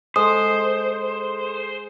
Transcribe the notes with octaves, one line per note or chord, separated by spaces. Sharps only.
G#3 A4 C5 D#6